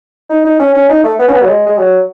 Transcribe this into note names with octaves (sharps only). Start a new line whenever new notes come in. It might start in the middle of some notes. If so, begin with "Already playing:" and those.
D#4
D#4
C#4
C#4
D#4
A3
B3
C#4
B3
F#3
G#3
G#3
F#3